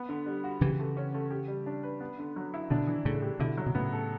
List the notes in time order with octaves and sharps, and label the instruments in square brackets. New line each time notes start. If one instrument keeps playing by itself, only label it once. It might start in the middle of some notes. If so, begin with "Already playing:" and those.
Already playing: [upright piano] B3 B4
D3
G3
F#4
[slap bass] C#3 E3 [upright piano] G4
[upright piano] A3
C#4
A3
G4
G3
D4
B4
B3
D3
F#3
E4
[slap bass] B2 D3 [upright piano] D4
[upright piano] E3
[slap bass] A2 C#3 [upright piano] A3
[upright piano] G4
[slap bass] B2 D3 [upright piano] E4
[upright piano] F#3
[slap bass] B2
[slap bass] A2 C#3 [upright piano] B3
[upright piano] A4